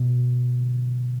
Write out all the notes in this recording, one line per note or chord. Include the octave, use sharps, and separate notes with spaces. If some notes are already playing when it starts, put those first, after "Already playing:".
Already playing: B2